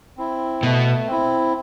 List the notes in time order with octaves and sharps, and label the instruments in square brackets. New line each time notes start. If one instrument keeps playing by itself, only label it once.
[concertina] C4 E4
[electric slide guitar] B2 [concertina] A3
[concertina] C4 E4